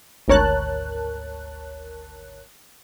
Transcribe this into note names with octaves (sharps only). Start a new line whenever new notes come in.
G#1 D2 A#4 C#5 A5 F#6